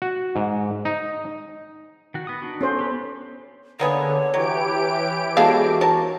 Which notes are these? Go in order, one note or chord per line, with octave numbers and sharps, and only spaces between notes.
F#4
G#2
D#4
D#3 F#4
B3 D#6
D4 D#4 F#4
B3 C#4 A4 C5
G4 B4
D3 A#3 B3 G#4 C#5
E3 F#3 G4 D7
G#3 B3 F#4 A4 F5
A#4 C#5 A5